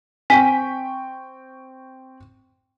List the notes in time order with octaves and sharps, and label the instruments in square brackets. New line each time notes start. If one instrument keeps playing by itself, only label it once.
[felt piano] C4 G5 C#6 [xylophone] G#5 B6